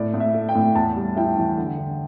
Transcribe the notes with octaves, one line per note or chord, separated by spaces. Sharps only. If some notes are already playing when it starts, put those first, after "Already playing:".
Already playing: A2 D5
A2
E5
A3
G5
A2
E2 A5
G3
E4 G5
E3
D3
D3